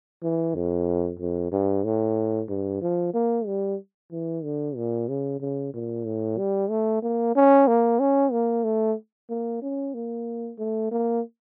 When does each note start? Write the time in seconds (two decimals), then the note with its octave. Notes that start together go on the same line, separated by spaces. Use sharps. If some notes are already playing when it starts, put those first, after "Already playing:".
0.22 E3
0.54 F2
1.19 F2
1.52 G2
1.84 A2
2.49 G2
2.81 F3
3.14 A#3
3.46 G3
4.11 E3
4.43 D3
4.76 A#2
5.08 C#3
5.40 C#3
5.73 A#2
6.06 A2
6.38 G3
6.70 A3
7.03 A#3
7.35 C#4
7.67 A#3
7.99 C#4
8.32 A#3
8.64 A3
9.29 A#3
9.62 C#4
9.94 A#3
10.58 A3
10.91 A#3